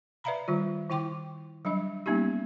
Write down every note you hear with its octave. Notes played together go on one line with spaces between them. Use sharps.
B4 D5 E5 F5 A#5 B5
D#3 G3 F4
D#3 E4 G5 C6 D6
F#3 G3 D4 D#5
G3 A#3 B3 C#4 D#4 G4